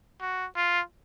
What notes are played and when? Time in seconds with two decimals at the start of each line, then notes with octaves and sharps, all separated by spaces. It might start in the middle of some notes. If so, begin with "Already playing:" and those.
0.21 F#4
0.56 F4